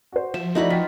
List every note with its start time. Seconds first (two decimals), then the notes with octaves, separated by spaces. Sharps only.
0.12 F#4 C5
0.34 F3 E5
0.55 A3 D#4 E4 F#4 D5 B5
0.70 F4 G5 B6